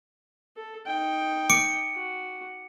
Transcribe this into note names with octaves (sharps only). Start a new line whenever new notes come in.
A4
D#4 G5
D6 C#7 D7
F#4